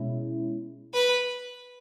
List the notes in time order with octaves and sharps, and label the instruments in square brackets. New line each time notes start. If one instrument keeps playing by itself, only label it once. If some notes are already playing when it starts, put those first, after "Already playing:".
Already playing: [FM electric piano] B2 G#3 C#4 E4
[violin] B4